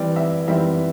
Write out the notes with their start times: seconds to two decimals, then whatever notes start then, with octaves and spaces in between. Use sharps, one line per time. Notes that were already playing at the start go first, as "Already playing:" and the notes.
Already playing: E3 G3 C4 D5
0.16 E5
0.48 E3 G3 C4 E5